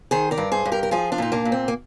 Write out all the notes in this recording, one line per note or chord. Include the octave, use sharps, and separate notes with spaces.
D#3 G#4 C5
A#4 D5
G2
G#4 C5
G2
G4 A#4
A#4
F3 F4 G#4
D4 F4
A#2 D#4
A#3 D4
A#2
C4
A#3